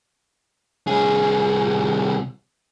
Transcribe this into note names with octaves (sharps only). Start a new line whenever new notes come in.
C2 G#4